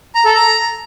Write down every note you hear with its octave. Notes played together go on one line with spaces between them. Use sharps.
A#5
A4
A#5